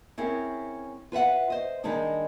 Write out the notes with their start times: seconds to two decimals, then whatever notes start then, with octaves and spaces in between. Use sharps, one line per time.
0.18 C4 C#4 E4 G#4 A#4
1.12 F4 B4 E5 F#5
1.50 C5 D#5
1.84 D#3 G3 G#3 A#3 D4 D#4